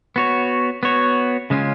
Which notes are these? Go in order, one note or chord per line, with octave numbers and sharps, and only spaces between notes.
B3 F#4 C#5
B3 F#4 C#5
C#3 G#3 C#4 F4